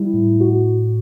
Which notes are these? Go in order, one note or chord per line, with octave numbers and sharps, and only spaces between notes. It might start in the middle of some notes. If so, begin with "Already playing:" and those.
Already playing: G3 E4
A2
A2 F#4